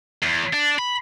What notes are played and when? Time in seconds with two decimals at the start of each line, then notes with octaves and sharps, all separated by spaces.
0.23 E2
0.54 D4
0.79 B5